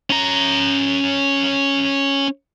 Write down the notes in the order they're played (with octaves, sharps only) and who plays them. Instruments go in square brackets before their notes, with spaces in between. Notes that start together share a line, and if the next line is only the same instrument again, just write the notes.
[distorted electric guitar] C#4 A#5